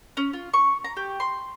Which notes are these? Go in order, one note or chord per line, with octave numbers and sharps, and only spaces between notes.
C#4
F4
C#6
A#5
G4
C6